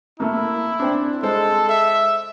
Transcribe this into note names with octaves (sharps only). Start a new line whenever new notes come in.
A3 A#3 E4
C4 D4
G#3 A4 C5
E5